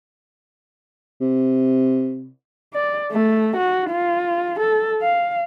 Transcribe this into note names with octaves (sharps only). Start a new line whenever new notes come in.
C3
D5
A3
F#4
F4
A4
F5